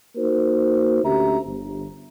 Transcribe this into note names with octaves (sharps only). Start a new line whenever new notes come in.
A#3 D#4 F#4 A#4 C5
D2 C#4 G4 E5 A#5
G1